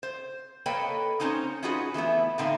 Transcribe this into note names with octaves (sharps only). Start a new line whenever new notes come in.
C5
A#3 A4 B4 C#5 D#5 G5
C4 C#4 D#4 C5 C#5
C#4 D#4 F4 F#4 G#4 B4
E3 A3 B3 E4
A2 D3 C4 D#4 E5 F5